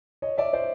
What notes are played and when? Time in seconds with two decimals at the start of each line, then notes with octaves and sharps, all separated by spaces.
0.22 C#5 D#5
0.38 D5 E5
0.53 C5 D5